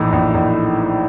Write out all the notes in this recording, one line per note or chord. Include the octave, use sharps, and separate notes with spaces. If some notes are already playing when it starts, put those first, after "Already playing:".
Already playing: A#1 A2 E3 D#4
A#1
A#1